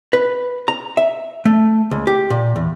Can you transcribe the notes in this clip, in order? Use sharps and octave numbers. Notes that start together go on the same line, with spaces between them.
B4
A#5
E5
A3
C#2
G4
A#2
E2